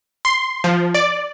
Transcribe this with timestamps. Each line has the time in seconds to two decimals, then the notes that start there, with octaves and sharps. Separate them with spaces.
0.25 C6
0.64 F3
0.94 D5